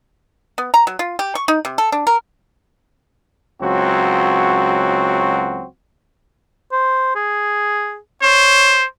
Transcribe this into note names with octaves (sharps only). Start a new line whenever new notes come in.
B3
A#5
F#3
F4
G4
C#6
D#4
C3
A4
D4
A#4
C#2 F#3 C4 F#4
C5
G#4
C5 C#5